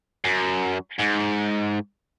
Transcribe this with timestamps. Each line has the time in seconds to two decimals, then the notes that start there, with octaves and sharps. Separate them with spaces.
0.24 F#2
1.00 G#2